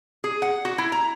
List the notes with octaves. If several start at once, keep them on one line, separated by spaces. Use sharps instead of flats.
G#4
F#5
F#4
E4
A#5